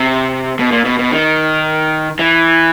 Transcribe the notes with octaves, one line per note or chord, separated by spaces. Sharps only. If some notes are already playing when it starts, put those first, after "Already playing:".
Already playing: C3
B2
A#2
B2
B2
D#3
E3